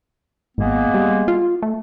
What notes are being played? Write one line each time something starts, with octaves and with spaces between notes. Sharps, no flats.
G#1 G#3 A#3 B3
G3
F4
A3